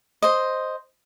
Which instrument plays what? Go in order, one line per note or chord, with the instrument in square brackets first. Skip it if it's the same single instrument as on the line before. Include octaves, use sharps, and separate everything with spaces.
[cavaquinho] C5 D#5